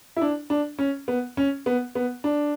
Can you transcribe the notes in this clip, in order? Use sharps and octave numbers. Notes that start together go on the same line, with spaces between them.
E4
D4
D4
C#4
B3
C#4
B3
B3
D4